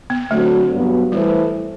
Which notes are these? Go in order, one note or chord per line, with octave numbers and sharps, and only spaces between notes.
B3
D3 F#3 A3 C4 F#4 A4
G2 F#3 B3
E3 G3 A3 E4 A4 C5